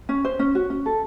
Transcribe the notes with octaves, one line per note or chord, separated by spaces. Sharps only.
C#4
C5
C#4
F#4
C#4
A4